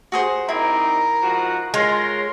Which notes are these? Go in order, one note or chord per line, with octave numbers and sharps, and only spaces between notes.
F#4 G#4 C5
G3 C4 D#4 E4 A#4
G#2 F3 F#4
G#3 F4 A#4 C#5 C6